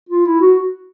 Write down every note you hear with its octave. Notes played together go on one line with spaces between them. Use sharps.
F4
E4
F#4